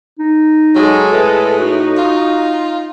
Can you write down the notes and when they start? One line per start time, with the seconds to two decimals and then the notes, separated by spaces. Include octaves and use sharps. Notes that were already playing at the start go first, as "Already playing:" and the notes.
0.19 D#4
0.75 F#3 G#3 A4
1.12 A2 B4
1.59 D#4 F#4
1.98 F4